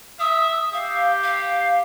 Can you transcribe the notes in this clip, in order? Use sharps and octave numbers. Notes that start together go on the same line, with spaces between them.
E5 D#6
G4 F5
F5